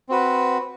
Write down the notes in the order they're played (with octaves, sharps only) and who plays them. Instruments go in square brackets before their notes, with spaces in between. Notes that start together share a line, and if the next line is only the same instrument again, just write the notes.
[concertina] C4 F#4 B4